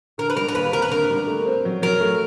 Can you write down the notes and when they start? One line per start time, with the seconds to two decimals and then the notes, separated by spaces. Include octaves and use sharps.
0.18 D3 A#4
0.30 B4
0.37 G3 A#4
0.48 A#4
0.55 D#2 B4
0.73 C4 A#4
0.82 B4
0.91 D3 A#4
1.10 G3
1.27 A3
1.46 C4
1.65 F#3
1.82 F#3 A#4
2.01 A3